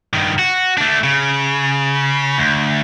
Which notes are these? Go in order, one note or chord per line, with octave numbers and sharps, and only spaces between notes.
G2 D#3
F#4
A3 D4
C#3
D2